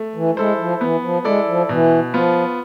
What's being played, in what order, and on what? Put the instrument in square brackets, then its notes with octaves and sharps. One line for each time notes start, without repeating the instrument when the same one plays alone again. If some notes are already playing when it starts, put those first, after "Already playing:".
Already playing: [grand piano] A3
[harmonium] E3
[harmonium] G#3 [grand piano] E4 A4 C5
[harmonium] F3
[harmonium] E3 [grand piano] B3
[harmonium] F3
[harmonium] G#3 [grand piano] E4 A4 D5
[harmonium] F3
[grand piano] B2 [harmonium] E3
[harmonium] F3 [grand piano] B3 F4